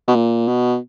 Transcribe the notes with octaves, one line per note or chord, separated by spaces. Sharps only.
B2
A#2
B2